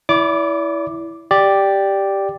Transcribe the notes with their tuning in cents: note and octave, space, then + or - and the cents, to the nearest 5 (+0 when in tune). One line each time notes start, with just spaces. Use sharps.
E4 +0 D5 -40 D6 +0
G4 +0 D5 +0